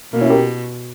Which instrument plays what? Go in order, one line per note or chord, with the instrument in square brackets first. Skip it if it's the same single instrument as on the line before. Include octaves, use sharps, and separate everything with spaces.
[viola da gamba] B2 [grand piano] A#3
[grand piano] C#4 E4
G4 A#4